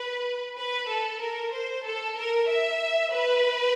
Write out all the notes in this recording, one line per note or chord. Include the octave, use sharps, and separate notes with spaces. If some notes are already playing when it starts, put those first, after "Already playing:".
Already playing: B4
B4
A4
A#4
C5
A4
A#4
E5
B4